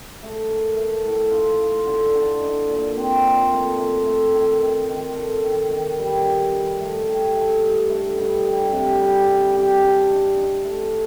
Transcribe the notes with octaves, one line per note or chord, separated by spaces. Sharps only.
A3
A#4
A3
A2
F4
F4
D3
D3
D#4
A#2
C4
A#2
A3
A3
A3
D#3
D#3
D#3
A4
D#3
D#3
G3
D#4
D#4
A3
G4
A3
G2
A3
G2
G3
C3
G3
G3
G4
D4
D#4
D#4
A3